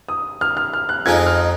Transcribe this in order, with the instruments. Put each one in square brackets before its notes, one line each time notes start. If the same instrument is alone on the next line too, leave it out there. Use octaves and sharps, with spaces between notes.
[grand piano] D#6
F6
F6
F6
F#6
[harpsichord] F2 F3 G#3 D#4 [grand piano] G#6
[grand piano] F6